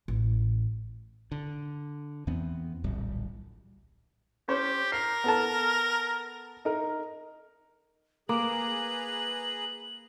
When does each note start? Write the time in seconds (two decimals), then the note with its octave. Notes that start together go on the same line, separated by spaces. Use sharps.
0.08 A1
1.32 D3
2.27 E2 E3 B3 C4
2.84 D1 A#1 G3
4.48 C#4 G4 C5 C#5
4.92 A#4 C7
5.24 B3 A4 A5
6.65 D#4 A#4
8.29 A#3 G#4 B4 A#5 D6 F#7